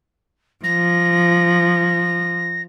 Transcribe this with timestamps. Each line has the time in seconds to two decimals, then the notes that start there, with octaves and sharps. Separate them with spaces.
0.64 F3 A#6